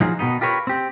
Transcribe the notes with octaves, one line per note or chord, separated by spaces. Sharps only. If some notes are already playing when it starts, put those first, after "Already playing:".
F3 F#3 D#4 F4 G#4 C5
B2 D#3 B3 D#4
F4 G4 A#4 B4 C#5
C4 G4